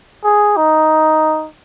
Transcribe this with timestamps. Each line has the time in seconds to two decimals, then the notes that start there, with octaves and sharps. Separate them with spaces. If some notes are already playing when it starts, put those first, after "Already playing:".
0.24 G#4
0.57 D#4